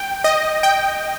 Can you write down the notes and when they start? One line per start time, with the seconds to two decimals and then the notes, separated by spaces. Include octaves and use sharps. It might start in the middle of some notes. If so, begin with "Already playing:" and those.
Already playing: G5
0.24 D#5
0.63 G5